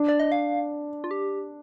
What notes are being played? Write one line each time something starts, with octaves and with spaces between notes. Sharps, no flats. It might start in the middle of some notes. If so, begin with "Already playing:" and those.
Already playing: D4
D5
D#5
F5
F4
G4